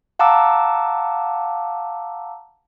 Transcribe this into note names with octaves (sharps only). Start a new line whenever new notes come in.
F5 F#5 A5 A#5 D6 E6